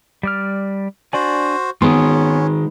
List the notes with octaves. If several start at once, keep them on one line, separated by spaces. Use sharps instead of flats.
G3 D5 F6
D4 F#4 C5 D5 G#5
D#3 G#3 B3 C#4 C6 D#6